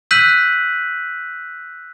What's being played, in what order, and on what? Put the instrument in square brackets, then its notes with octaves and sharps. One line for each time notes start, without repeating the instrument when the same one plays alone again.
[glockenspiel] E6 F#6 G6 B6 D#7 F#7